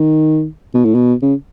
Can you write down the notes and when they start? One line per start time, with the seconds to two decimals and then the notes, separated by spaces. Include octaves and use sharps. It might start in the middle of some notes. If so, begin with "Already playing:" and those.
Already playing: D#3
0.74 B2
0.85 A2
0.95 B2
1.22 C#3